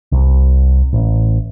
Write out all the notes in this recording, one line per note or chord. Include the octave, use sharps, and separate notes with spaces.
C2
A1